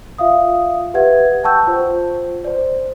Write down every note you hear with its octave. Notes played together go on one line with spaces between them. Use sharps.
F4 E5 F5 D#6
G4 B4 E5 F#5 G#6
F#5 G5 A5 C#6 E6 G6
F4 C5
C5 D5